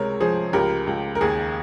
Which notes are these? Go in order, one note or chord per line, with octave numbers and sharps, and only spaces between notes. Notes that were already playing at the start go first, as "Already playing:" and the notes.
Already playing: C#2 C3 G#3 A#4 C#5
F3 G#4 C5
C#2 G4 A#4
C#2
A#4
D#2 G#4